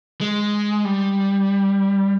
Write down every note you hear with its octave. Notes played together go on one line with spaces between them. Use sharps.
G#3
G3